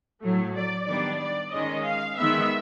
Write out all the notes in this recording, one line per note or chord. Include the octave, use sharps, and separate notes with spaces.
A2 F#3 A3
D5
D#3 G3 B3 D4 D5
D5
D#3 G#3 C#4 D#5
F5
D#3 G#3 B3 E5